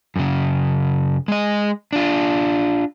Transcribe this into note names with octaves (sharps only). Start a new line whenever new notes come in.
F#2 C#3
G#3 D#5
D4 F4